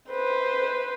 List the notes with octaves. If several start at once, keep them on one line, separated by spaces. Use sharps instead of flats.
B4 C5